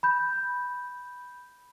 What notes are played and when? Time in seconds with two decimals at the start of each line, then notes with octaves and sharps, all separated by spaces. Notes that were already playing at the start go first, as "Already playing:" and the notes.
0.03 B5 G6